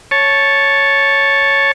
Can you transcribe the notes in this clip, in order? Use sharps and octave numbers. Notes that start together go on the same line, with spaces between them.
C#5 A5